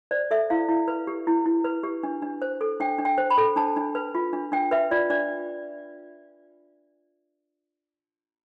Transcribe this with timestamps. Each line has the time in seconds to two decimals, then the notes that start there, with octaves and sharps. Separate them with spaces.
0.11 C5 D5
0.31 A4 E5
0.50 E4 F5
0.69 E4
0.88 B4
1.07 G4
1.27 E4
1.46 E4
1.64 B4
1.83 G4
2.03 D4
2.22 D4
2.42 C5
2.61 A4
2.80 D4 G5
2.99 D4
3.05 G5
3.18 C5
3.30 B5
3.38 A4
3.56 D4 A5
3.76 D4
3.95 B4
4.15 F4
4.33 D4
4.52 D4 G5
4.71 B4 E5
4.91 F4 D5
5.10 D4 D5